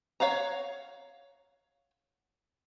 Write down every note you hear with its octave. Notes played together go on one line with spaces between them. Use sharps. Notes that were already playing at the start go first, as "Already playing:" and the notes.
C#5 F5 F#5 A#5